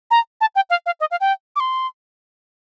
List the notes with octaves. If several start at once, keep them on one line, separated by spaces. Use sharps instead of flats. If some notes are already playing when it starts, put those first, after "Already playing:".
A#5
A5
G5
F5
F5
D#5
F5
G5
D6
C6